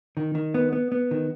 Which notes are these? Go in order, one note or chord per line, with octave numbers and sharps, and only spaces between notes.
D#3
D#3
B3
B3
B3
D#3